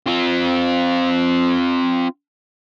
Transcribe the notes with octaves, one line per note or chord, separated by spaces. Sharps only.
C4 F4